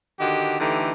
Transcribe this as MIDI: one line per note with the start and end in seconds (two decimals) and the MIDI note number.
0.20 0.59 50
0.20 0.59 51
0.20 0.59 63
0.20 0.59 66
0.20 0.59 67
0.60 0.92 50
0.60 0.92 52
0.60 0.92 57
0.60 0.92 63
0.60 0.92 67